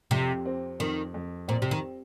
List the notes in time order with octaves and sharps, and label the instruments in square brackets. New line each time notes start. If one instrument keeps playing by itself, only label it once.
[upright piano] F2 [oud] C3
[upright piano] C4
[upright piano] F2 [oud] D#3
[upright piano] F2
[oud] A#2 [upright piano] C4
[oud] C3
D#3